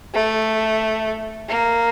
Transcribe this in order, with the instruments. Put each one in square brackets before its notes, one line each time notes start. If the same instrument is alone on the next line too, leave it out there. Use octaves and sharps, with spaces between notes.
[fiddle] A3
A#3